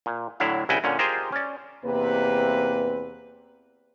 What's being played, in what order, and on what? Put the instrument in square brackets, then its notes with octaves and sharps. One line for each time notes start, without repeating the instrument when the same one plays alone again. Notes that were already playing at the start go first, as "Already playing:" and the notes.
[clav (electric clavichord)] A#2
A2 D3 F#3 E4 F5
C2 C#3 E4 F#4 G5 G#5
A#2 D3 C#4
F4 G4 G#4 A#4 C5 D#5
C#4 D5
[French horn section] E2 C3 A#3 C4 B4